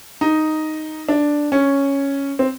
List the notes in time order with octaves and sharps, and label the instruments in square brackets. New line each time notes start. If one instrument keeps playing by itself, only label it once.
[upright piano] D#4
D4
C#4
C4